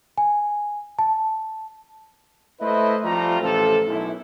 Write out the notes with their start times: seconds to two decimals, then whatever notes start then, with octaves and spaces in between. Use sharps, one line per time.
0.18 G#5
0.99 A5
2.61 A3 E4 B4 C5 D#5 E5
3.04 F3 G3 A3 C4 F4 A#5
3.41 A1 C3 F3 A4
3.87 B1 F#2 E4